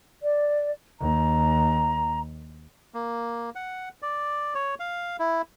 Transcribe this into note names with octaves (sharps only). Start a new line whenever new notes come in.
D5
D#2 A#5
A#3
F#5
D5
C#5
F5
E4